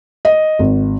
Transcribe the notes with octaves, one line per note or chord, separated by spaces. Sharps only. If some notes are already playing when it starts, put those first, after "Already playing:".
D#5
G#1